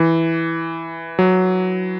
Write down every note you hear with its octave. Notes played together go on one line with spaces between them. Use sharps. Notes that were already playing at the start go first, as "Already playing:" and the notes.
Already playing: E3
F#3